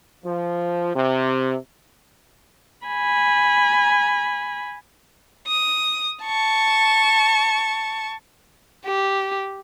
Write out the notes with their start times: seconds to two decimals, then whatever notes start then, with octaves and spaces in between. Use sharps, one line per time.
0.25 F3
0.95 C3
2.87 G#5 B5
5.47 D#6
6.23 A5 C#6
8.86 G4